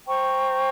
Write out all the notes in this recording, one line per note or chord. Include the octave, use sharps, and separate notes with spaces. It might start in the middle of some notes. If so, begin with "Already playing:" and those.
C5 G5 A#5 C#6